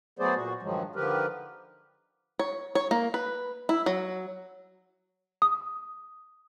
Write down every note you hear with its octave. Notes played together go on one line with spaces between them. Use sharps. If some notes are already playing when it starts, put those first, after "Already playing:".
F#3 A3 B3 G#4 C5 D5
A#2 F#4
G2 D#3 F3 F#3 G#3
D3 D#3 F3 G4 A#4 B4
C#5
C#5
A#3
B4
E4
F#3
D#6